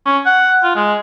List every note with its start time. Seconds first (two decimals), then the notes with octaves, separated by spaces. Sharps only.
0.06 C#4
0.26 F#5
0.63 F4
0.76 G#3